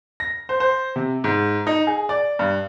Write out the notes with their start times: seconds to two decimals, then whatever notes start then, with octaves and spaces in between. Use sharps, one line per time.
0.20 A#6
0.49 C5
0.60 C5
0.96 C3
1.24 G#2
1.67 D#4
1.87 G#4
2.09 D5
2.39 G2